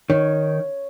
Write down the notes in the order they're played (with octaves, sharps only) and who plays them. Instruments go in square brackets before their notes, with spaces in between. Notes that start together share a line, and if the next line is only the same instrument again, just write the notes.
[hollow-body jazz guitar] D#3 [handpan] C#5